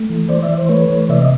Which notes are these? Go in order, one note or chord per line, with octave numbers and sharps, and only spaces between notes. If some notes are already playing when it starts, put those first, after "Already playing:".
Already playing: A3
E3
E3 C5 D5
D5 E5
E3
C5
A3 B4 C#5
E3
C3 D5 E5
D#5